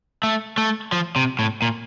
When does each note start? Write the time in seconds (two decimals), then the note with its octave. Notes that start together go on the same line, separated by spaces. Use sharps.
0.23 A3
0.58 A3
0.92 F3
1.16 C3
1.39 A2
1.62 A#2